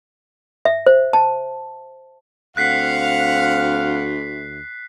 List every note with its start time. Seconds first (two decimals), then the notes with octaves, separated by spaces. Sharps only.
0.65 E5
0.87 C5
1.13 A5
2.57 D2 C4 F5 F#5 F#6 B6 C7